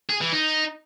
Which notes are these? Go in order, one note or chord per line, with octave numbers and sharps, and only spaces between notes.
G#4
E3
D#4